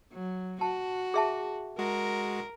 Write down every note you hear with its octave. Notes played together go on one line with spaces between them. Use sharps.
F#3
F#4 A5
G#4 E5 A5
G#3 F#4 A#4